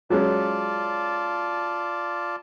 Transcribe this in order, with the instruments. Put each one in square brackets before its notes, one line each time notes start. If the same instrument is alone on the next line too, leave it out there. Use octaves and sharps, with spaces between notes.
[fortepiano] F#3 G#3 C#4 [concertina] F4 D5 A5